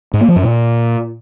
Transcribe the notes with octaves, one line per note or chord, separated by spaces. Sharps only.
G#2
A#3
F3
F#2
A#2